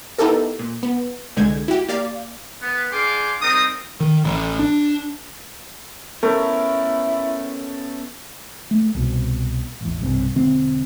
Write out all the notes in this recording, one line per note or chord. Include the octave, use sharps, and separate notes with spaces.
B3 D#4 E4 G4 A4 A#4
A#2
B3
C2 D3 G#3 G6 G#6
E4 F#4 G4
A#3 G4 D5 F5
B3
D4 G#4 F5 G5 C6 D6
G3 C4 D#4 A#4 D#6
D#3
A1
D4
A3 B3 C#4 E4 A#4
A3
C2 B2
A1 E2
B1 G2 C3
E1 D3 C4